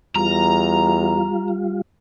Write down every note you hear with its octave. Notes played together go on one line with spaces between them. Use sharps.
E2 G3 F4 A#5